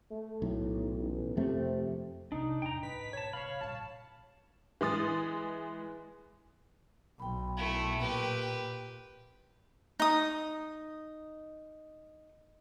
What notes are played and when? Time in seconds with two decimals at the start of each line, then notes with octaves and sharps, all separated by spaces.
0.11 A3
0.42 B1 A2
0.97 A1
1.37 F2 C3 A3
2.32 C3 G#3 D4 D#4
2.62 E2 A2 G5 A#5
2.83 G#2 B2 B4 B6
3.13 A3 C#5 A5
3.33 A#2 C#3 C#5 F5 B5
3.61 A#2 G3 A5
4.81 E3 G#3 D#6 A6
7.20 B1 G5 B5
7.57 A3 E4
8.00 A#2 G4 B4
10.00 D#4 D#6